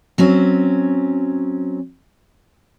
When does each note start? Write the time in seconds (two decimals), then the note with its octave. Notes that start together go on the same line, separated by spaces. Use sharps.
0.18 F#3 C4 C#4